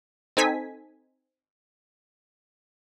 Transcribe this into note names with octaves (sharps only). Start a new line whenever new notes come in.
C4 D#4 A4 G#5 B6